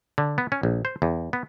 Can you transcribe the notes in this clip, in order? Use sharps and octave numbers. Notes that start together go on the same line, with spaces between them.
D3
B3
C#4
A#1
C5
E2
B3